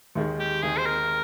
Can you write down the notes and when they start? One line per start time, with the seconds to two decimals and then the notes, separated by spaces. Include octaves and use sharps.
0.15 D#2 D#3 G#3
0.39 G4
0.62 D#2 D#3 G#3 G#4
0.78 C5
0.86 A#4